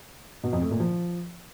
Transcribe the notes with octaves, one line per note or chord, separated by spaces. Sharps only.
B2
F2
A3
A#2
F3